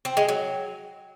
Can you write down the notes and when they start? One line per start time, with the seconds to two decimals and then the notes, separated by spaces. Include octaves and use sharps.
0.05 C4
0.17 G#3
0.29 F#3